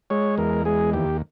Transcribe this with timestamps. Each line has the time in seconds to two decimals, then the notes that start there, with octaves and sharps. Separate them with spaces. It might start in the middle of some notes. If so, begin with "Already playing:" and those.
0.10 G#3 C#5
0.38 E2 A#4
0.65 G#3 G#4
0.93 D#2 G4